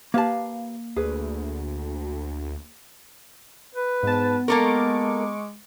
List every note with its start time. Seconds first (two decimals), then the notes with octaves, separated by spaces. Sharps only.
0.14 A#3 G4 B4 F5 A5
0.96 D2 G#4 B4
3.74 B4
4.03 G#2 B3 A5
4.48 G#3 A#3 A4 A#4 C#6 D6